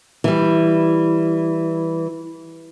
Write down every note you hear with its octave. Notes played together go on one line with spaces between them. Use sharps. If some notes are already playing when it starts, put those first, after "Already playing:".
E3 G3